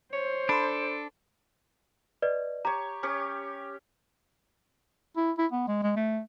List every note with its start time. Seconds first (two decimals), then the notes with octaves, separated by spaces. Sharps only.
0.13 C5 C#5
0.49 D4 A4 B5 C6
2.22 B4 D5 D#5
2.65 G4 C#5 A#5
3.03 C#4 G4 C#5
5.17 E4
5.38 E4
5.52 B3
5.68 G#3
5.83 G#3
5.96 A3